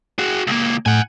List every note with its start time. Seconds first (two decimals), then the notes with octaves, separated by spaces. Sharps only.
0.19 F#4 G#4
0.47 C#2 A#3
0.86 A2 F#5 G#5